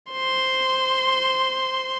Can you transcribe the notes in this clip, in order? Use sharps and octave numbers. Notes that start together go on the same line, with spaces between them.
C5 C6